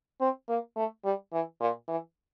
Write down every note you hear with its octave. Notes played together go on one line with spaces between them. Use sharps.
C4
A#3
A3
G3
E3
A#2
E3